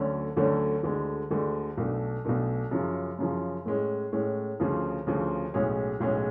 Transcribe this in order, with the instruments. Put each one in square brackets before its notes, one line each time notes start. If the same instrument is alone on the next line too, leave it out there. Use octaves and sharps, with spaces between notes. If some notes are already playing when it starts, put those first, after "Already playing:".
Already playing: [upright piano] D2 D3 F#3 A3 C#4
D2 D3 F#3 A3 C#4
D2 D3 G#3
D2 D3 G#3
B1 B2 A3 D4
B1 B2 A3 D4
F#2 C#3 F3
F#2 C#3 F3
A2 G#3 C#4
A2 G#3 C#4
D2 C#3 F3
D2 C#3 F3
B1 A2 G#3 C#4 G#4
B1 A2 G#3 C#4 G#4